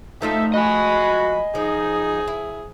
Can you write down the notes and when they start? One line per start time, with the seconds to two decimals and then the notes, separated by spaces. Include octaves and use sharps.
0.22 F3 A3 D#4 F4 A4 E5
0.54 F#4 D#5 G#5 B5
1.55 F3 D#4 G#4
2.28 E4